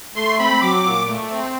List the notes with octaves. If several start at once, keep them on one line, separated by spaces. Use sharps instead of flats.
A3 C6
C4 B5
F#3 D6
A#2
A3
C4